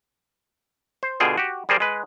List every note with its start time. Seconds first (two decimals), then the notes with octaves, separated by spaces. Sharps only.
1.03 C5
1.20 B2 D3 F4 G#4 G5
1.38 F#4 G4
1.69 G3 G#4 A#4 C5 D5
1.80 G#3 B4